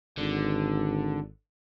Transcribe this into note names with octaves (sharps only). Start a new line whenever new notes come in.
G#1 D3